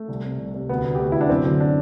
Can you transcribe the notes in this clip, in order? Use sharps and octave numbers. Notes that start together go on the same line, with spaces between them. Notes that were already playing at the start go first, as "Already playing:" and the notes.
Already playing: A3
C2
C3
C2
C3
D2 B3
D2
G4
D2
F#4
D2 E4
D4
F#2 C4
D3
D4